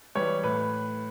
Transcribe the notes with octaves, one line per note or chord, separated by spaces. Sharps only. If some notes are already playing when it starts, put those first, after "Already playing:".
E3 G3 C#5
A2 B4